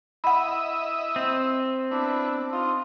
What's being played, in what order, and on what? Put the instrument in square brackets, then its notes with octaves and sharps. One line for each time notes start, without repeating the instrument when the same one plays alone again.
[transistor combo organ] E4 D#5 E5 [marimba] F#5 B5
[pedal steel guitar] C4
[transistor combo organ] B3 E4 [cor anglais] D4
[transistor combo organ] D#4 [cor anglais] F4